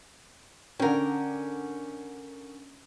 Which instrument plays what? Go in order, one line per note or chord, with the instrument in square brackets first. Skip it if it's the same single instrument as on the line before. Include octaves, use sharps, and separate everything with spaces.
[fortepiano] D3 C#4 [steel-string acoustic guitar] A#4 G5